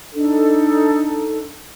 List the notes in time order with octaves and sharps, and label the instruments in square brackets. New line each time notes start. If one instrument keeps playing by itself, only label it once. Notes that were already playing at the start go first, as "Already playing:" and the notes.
[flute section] D4 D#4 A4